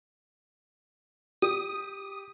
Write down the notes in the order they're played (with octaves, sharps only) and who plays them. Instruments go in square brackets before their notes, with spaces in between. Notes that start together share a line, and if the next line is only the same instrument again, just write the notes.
[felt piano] G4 [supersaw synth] D#6